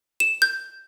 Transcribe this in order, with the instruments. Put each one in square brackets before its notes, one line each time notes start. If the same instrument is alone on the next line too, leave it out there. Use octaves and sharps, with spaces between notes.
[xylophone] E7
G6